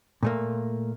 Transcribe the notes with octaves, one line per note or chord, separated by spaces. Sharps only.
A#2 A3 A#3